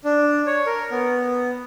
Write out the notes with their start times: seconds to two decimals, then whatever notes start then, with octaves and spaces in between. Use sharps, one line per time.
0.05 D4
0.47 C#5
0.66 A#4
0.91 B3